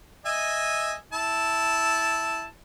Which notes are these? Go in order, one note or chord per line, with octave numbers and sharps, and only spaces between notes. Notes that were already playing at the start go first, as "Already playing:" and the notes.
D#5 E5 G#5
E4 A5